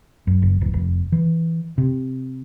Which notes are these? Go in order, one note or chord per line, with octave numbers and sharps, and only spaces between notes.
F#2
F#1
D1
F1
E3
C3